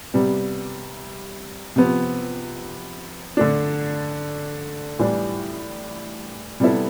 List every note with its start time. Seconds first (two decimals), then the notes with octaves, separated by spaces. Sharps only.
0.14 C3 G3 B3
1.76 C3 F3 B3
3.37 D3 A3 D4
4.99 A2 E3 G3 D4
6.60 C3 G3 B3 E4 A4